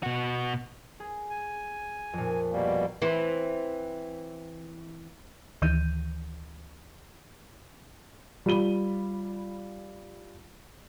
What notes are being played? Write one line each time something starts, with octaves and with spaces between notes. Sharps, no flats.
B2 F#4
G#4
G#5
F2 A#2
B2 G3 A#3
E3 C4
D2 D#3 E3 G6 D#7
G3 F4 B5 D#7 G7